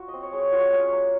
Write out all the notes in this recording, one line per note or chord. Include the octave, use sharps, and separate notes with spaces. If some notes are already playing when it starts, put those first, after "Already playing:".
Already playing: F4 F#4
D#5
C4
C#5
G#3
C#5
F4 F#4
C#4
A#3